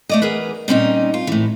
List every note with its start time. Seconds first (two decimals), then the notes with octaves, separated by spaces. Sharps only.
0.09 A3 D5 D#5
0.22 E2 G#4 A#4 B4
0.68 A#2 G3 C4 C#4 D#4
1.14 F4
1.27 A2 E3